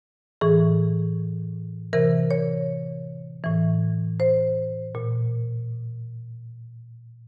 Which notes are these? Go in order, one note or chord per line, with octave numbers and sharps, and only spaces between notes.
A2 E3 G#4
C3 E3 A#4
C#5
A2 E3
C5
A#2